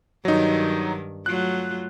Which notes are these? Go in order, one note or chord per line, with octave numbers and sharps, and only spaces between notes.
G2 D#3 F#3 D#4
F#3 A3 F4 F#6